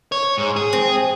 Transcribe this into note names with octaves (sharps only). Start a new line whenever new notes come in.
C#5
G#2
G#4
C4